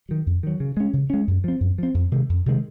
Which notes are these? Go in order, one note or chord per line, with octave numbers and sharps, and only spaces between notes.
D#3 F#3
F2
D#3 F#3
C#3
G#3 C#4
C#3
G#3 C#4
F#2
F3 C4
F#2
F3 C4
F2
C3 D#3 G#3
F2
C3 D#3 G#3